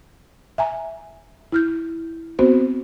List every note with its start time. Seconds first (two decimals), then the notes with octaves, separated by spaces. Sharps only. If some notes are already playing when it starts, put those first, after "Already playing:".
0.58 E5 G#5 A#5
1.52 E4 F6 G6
2.39 B3 C4 F#4 C5